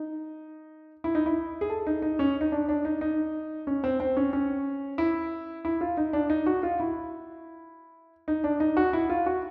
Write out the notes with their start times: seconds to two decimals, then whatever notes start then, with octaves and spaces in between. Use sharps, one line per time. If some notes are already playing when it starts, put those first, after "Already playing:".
Already playing: D#4
1.04 E4
1.15 D#4
1.26 E4
1.61 G#4
1.70 A4
1.87 D#4
2.02 D#4
2.19 C#4
2.41 D#4
2.52 D4
2.69 D4
2.85 D#4
3.01 D#4
3.67 C#4
3.84 C4
4.00 C4
4.17 C#4
4.33 C#4
4.98 E4
5.65 E4
5.81 F4
5.97 D#4
6.13 D4
6.30 D#4
6.46 F#4
6.63 F4
6.80 E4
8.28 D#4
8.44 D4
8.60 D#4
8.77 F#4
8.93 E4
9.10 F4
9.26 F#4